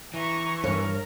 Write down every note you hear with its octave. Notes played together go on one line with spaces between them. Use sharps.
E3 A#5 C#6
G2 A#4 C#5